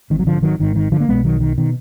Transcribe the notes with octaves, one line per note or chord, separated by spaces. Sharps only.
G#1 G#2 D#3
F#3
D3 F3
D#3 F#3
G#1 G#2 D#3
D#3
D3 F3
A#3
B1 B2 G#3 B3
D#3 F#3
D#3
B2 D#3